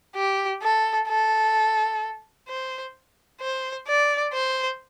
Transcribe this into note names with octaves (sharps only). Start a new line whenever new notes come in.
G4
A4
A4
C5
C5
D5
C5